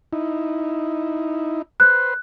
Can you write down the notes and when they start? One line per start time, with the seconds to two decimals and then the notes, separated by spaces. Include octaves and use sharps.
0.13 D#4 E4
1.80 B4 C5 F#6